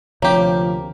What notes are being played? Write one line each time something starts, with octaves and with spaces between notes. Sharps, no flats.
D2 C3 F3 A#3 G4 C#5